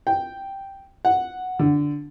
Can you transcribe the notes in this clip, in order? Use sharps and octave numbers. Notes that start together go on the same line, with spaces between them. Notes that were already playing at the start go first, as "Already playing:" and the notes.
G5
F#5
D3